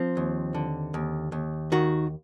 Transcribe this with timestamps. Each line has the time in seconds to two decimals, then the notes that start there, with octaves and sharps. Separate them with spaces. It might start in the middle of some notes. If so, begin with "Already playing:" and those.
Already playing: F3 C4
0.17 D#2
0.54 D3
0.94 D#2
1.32 D#2
1.72 D#3 F#4